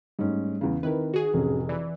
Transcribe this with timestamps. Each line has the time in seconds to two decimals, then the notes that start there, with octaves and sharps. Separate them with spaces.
0.19 G#2 G3 A3 C#4
0.61 E2 C#3
0.83 D#3 C4 E4 A#4 B4
1.14 D#4 F#4 G#4
1.34 F1 A2 C4 C#4
1.69 E3 D5